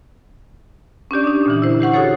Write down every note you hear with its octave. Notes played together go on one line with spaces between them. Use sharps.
C#4 D4 G4 D5
D4 D#4
A#2 D3 E3
E4 C5
G4 C5 F#5 C#6
D#4 F#4 G#4 A4 C#5